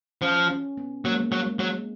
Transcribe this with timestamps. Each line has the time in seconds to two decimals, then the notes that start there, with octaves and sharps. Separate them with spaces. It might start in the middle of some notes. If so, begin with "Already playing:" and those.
0.22 F3 C#4
0.50 C#4
0.77 B3
1.04 F#3 A#3
1.12 G#3
1.20 A#3
1.32 F#3
1.46 G#3
1.59 F#3